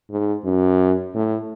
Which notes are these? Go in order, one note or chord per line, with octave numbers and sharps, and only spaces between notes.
G#2
F#2
A2